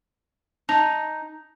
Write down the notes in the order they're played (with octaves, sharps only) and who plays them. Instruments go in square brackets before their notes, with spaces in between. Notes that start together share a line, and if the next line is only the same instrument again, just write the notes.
[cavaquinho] D#4 [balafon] A5